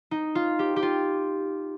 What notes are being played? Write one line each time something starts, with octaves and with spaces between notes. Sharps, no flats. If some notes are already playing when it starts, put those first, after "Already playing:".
D#4
F4
G4
G4
F4